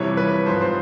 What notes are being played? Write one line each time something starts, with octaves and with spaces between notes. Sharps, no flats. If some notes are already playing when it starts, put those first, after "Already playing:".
Already playing: F2 C3 E3 G3 C#5
B4
G#2 F3 C5
C5